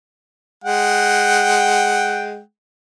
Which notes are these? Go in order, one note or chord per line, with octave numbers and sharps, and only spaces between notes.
G#3 F#5 G5